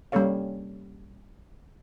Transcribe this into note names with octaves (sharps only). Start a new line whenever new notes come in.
G3 A#3 C#4 A4 C#5 F5